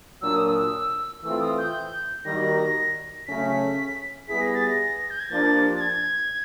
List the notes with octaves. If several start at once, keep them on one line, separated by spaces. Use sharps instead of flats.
A#2 F#3 A#3 D4 E6
D#6
E6
E3 A3 C4 F4 E6
D#6
G6
D#3 G3 A#3 D#4 F#4 A#6
C#3 F#3 A3 C#4 B6
G3 B3 E4 G#4 B6
A#6
A6
A#6
G6
G#6
F3 A#3 D4 G4 A6
A6
G#6